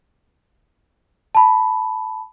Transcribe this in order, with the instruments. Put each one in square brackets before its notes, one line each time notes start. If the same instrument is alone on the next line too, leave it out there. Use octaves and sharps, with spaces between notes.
[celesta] A5 B5